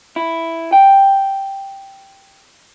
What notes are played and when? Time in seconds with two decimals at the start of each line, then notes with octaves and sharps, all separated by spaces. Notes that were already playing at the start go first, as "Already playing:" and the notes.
0.16 E4
0.73 G5